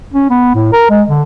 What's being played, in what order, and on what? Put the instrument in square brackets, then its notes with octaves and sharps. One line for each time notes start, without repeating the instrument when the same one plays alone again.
[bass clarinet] C#4
B3
A2
A#4
G#3
D3